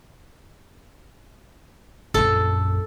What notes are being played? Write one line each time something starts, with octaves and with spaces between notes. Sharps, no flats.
A#1 F#2 A4